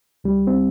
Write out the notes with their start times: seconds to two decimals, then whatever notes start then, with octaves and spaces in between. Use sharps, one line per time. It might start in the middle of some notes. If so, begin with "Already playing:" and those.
0.24 C#2 G3
0.47 C4